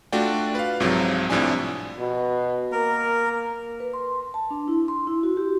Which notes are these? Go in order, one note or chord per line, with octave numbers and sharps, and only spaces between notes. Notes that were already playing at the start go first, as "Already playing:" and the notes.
A3 D4 F4 F#4 D5 G5
B4 F5
C2 G#2 C3 F3 F#3
C2 A2 C3 F3 D4 G#5
B2
A#3 A#4
B4
C6
A5
D4
E4
C6
E4
F#4
G4